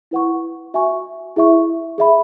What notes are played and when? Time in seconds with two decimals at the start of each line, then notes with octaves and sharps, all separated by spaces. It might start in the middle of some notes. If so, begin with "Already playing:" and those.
0.11 E4 B4 F#5 C#6
0.74 F#4 E5 G#5 C#6
1.36 E4 G#4 E5 C#6
1.98 G#4 E5 B5